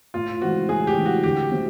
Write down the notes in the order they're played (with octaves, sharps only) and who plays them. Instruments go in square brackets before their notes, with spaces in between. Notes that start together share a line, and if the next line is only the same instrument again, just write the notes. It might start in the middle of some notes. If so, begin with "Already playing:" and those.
[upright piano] A2 [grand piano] F4
[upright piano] E3 G#3 C4 [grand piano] F#4
[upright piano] A2 [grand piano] G#4
[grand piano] G4
[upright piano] E3 G#3 C4
[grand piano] F#4
[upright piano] D3 [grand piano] G4
[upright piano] F#3 A3 C4 E4